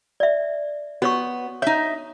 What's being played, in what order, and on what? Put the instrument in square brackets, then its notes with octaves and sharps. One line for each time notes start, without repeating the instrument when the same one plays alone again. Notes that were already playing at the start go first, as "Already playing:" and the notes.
[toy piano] D5 E5
[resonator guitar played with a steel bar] B3 [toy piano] F#4 C#5 C#6
[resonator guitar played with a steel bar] D#4 E5 [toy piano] C#5